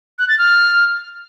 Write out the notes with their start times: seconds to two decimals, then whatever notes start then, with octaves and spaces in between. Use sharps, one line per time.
0.19 F#6
0.29 A6
0.38 F6